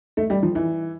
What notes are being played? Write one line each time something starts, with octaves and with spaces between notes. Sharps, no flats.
A3
G3
F3
E3